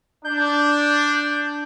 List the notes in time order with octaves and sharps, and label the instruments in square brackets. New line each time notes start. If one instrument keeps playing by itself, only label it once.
[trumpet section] D4 [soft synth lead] G6